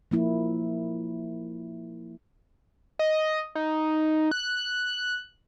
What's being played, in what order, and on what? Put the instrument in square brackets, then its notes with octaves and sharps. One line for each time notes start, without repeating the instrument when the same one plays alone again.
[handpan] F3 A#3 E4
[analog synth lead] D#5
D#4
F#6